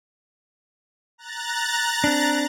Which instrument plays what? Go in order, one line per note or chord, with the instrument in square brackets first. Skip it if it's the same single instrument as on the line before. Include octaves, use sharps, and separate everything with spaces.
[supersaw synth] A#5 F#6 A6
[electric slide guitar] C4 D4